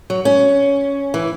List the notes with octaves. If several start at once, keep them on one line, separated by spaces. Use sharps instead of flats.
F#3
C#4
E3